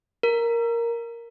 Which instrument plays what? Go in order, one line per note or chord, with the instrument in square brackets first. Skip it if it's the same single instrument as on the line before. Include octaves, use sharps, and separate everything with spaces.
[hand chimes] A#4